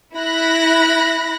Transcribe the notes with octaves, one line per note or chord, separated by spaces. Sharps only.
E4 B5 F#6 A#6